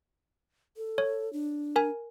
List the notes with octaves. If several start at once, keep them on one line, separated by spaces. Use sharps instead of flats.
A4
C#5
D4
A#4 G#5